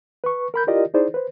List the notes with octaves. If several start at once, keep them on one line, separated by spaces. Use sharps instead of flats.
B4 C#6
A#4 B5 G6
E4 F4 G4 A#4 D5 D#5
D#4 E4 G#4 C5 D5
B4 C5